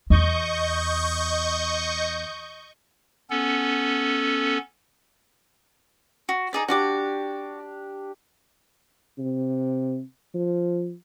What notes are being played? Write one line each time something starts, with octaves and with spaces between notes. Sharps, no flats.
E2 D#5 C#6 G6
B3 C#4 A4
F#4
D#4 G#4 D5
D4 F#4 G4 D5 D6
C3
F3